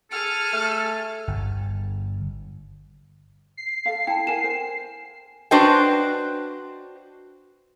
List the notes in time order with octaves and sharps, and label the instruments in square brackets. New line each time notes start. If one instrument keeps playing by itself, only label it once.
[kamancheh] G#4 F6 [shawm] A4
[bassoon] A3
[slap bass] G1
[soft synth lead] C7
[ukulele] A4 E5 F5
[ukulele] E4 A5 [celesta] G5
[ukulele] A#4 F#5 G#5 [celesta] E7
[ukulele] A#4 C5
[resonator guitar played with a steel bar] D4 F#4 B4 C5 D#5 G5